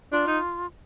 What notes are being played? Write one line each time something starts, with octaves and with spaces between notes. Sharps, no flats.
D4 F4
D#4